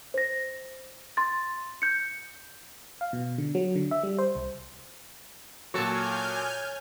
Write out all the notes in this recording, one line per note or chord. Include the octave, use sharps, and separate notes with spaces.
C5 A#6
C6 A6
G6 C#7
F5
B2
D3
F#3
D3
E5
G3
C5
C2
A#2 F#3 F#4 A4 C#5 G#5 F6 G6